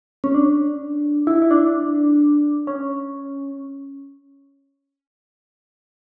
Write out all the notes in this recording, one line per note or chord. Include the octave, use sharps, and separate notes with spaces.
C#4
D4
E4
E4
D4
C#4